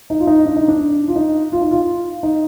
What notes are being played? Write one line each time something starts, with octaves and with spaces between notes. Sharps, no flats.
D#4
F4
D#4
D4
D#4
D4
F4
D#4
F4
D#4
F4
D#4